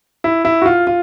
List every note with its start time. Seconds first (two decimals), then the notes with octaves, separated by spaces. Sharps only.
0.24 E4
0.45 E4
0.62 F#4
0.66 F4
0.87 F4